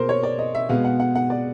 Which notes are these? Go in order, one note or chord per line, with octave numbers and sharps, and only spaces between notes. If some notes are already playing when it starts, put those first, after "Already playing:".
Already playing: B2 A#3 G#4 A#4 C5
C#5
D5
D#5
E5
B2 G#3 B3 F5
F#5
F#5
F#5
D5